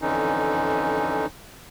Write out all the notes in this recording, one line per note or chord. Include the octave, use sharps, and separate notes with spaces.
F2 D3 E3 C#4 D#4